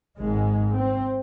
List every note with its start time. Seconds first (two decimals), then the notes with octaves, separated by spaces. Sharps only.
0.18 G#1 G#2 G#3
0.77 C4